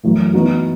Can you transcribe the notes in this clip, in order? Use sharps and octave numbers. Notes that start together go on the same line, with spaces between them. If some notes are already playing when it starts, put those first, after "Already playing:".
F#2 E3 A3
E3 B3 D#4 F#4